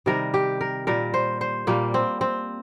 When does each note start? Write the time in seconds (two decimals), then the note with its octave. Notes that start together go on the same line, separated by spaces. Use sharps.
0.06 C3 D#3 G3 A#4
0.34 G4
0.61 A#4
0.87 A#2 G3 A#4
1.14 C5
1.41 C5
1.67 A#2 G3 A#3
1.94 C4
2.21 C4